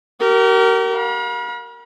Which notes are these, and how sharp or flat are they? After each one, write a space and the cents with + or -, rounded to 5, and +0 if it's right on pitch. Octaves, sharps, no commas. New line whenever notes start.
G4 -45 A#4 -10
F5 +40 B5 -45